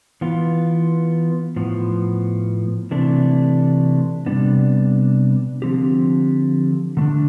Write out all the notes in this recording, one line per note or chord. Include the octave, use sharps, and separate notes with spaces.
E3 B3 F4
A2 F3 B3
C3 E3 A3 D4
C3 G3 B3 D4
D3 F3 C4 G4
D3 A3 D4